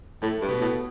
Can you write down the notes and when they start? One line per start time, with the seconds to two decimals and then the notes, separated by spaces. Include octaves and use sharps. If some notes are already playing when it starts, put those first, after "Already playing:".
0.22 A2 A3
0.41 G2
0.48 B2 B3
0.61 A2